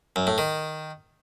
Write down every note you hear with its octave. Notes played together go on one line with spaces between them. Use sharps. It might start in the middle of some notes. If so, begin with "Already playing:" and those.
F#2
A2
D#3